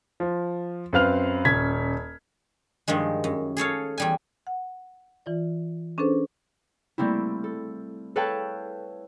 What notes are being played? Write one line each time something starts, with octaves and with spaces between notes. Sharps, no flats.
F3
F#2 C4 B4 F5 F6 F7
D#1 C#4 G#6 B6
G2 D#3 F3 G#3
F#2
G#4 A4 C#5 F5
E2 G3 G#5
F#5
E3 F4 D5
C#4 D4 G#4 A4 B4 C5
G3 A3 A#3 C4 E4
A4
A4 B4 C#5 F5 G5 A5